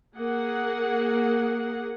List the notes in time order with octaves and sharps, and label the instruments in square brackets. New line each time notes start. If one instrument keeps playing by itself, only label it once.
[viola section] A#3 G#4 F#5